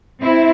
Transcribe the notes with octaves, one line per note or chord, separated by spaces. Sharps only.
C4 E4